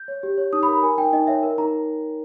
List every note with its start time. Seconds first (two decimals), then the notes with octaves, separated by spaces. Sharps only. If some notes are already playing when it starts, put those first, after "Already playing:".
Already playing: G6
0.08 C#5
0.23 G4
0.38 C#5
0.53 D#4 D#6
0.63 B5
0.67 A#4 A#5
0.83 A#4 G#5
0.98 D#4 G5
1.13 D#4 D#5
1.27 C#5 E5
1.43 A#4
1.58 D#4 A#5